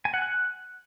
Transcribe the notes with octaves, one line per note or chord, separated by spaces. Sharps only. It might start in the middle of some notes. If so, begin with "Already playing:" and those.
G#5
F#5
F#6